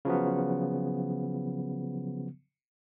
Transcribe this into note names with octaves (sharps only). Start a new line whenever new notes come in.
C#3 F3 F#3 B3